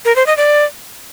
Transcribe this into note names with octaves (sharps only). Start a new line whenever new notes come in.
A#4
C5
D#5
D5